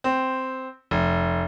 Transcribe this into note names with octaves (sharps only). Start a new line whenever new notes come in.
C4
F1